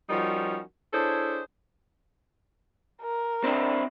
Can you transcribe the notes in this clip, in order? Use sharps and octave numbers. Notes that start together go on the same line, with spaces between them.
F3 G3 C#4 D#4 F#4 A#4
D4 E4 G#4 A4 C5 C#5
A#4
C4 D4 E4